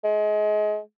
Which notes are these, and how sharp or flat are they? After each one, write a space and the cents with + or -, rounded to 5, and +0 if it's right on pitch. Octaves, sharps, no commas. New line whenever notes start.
G#3 +30